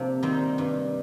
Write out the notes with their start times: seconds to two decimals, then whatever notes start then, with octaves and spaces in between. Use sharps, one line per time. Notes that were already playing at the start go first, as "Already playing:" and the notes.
Already playing: C3 F3 A#3 D4
0.23 D#3 G3 C4
0.58 G2